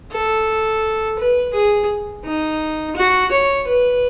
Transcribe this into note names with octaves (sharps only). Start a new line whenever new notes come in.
A4
B4
G#4
D#4
F#4
C#5
B4